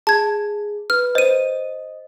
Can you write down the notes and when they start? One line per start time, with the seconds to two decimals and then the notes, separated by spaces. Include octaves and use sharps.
0.07 G#4 A5 G#6
0.90 B4 F6
1.15 C5 D#5 D#7